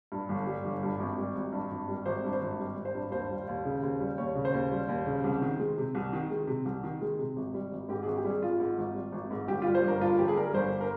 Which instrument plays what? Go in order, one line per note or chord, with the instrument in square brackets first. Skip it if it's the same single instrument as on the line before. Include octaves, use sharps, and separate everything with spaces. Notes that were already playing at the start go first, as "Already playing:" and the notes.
[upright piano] G2
G1
G3
G1
G2
G#1
G3
G#1
G2
G#1
G3
G#1 C5
G2
C5
G#1
G3
G#1
C5
G2
D#2 C5
G3
D#2
C#3
D#2
G3
D#2 C#5
C#3
C5
D#2
G3
D#2
C#3
C2
D#3
G#3
C3
C2
D#3
G#3
C3
C2
D#3
G#3
C3
G#1
G3
G#1
G#2 G4
G#1 G#4
G4
G3
G#4
G#1 F4
G#2
G#1
G3
G#1
G#2
G1 G4
G3 F4
C5
G1 A#4
G2 F4
G1 G4
G#4
G3 A#4
G1 C5
A#4